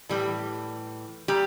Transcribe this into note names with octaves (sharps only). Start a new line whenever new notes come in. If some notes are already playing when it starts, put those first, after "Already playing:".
A2 E3 G3
A#2 G3 G4